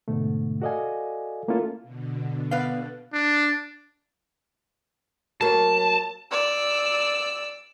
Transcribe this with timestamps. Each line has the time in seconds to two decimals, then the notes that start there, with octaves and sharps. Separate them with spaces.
0.08 G#2 B2 D3 A3
0.62 F#4 A4 D5 D#5 F5 G#5
1.48 A3 A#3 C#4 E4 F4 A4
1.82 B2 D3
2.51 B3 B4 D5 F5
3.13 D4
5.41 F#3 A#3 A5
6.31 D5 E6